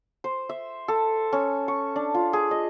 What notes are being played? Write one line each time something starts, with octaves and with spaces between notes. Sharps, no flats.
C5
E5
A4
C#4
C#6
D4
F4
G#4
D#5